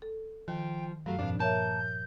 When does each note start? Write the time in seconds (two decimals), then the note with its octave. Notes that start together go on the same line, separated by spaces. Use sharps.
0.02 A4
0.48 D#3 F3 G5
1.06 G2 F#3 A3 F5
1.19 F2 A#2 F3 D4
1.39 A#3 A#4 C#5 E5 A5 G6